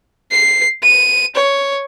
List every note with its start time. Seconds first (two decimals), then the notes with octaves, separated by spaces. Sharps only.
0.31 C7
0.83 D#7
1.35 C#5